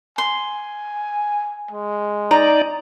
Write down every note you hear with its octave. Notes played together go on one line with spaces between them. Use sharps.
G#5 C6
G#3
D#4 D5 A#5